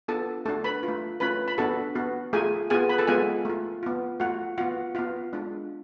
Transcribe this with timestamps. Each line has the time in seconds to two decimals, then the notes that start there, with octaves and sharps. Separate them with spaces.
0.08 B3 D4 F4 A4 A5
0.45 A3 D4 F#4 A4 A5
0.64 B4 B5
0.83 F4
0.88 A3
1.20 A3 C#4 F4 B4 B5
1.48 B5
1.58 B3 D4 F#4 A4 A5
1.95 B3 F#4
2.33 A3 F4 G#4 G#5
2.70 B3 F4 G#4 G#5
2.89 B4 B5
2.98 A4 A5
3.07 G#3 B3 F4 G#4 G#5
3.45 A3 F4
3.83 B3 F4
4.20 A3 F4 F#4 F#5
4.58 B3 F4 F#4 F#5
4.95 B3 F4 F#4 F5
5.33 G#3 D4 F4